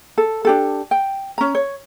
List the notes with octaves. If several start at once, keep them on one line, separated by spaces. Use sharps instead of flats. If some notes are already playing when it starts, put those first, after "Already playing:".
A4
D4 G4 A4
G5
C#4 A#5
C#5